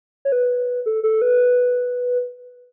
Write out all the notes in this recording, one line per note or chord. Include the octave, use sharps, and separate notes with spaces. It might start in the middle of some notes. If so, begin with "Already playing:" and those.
C#5
B4
A4
A4
B4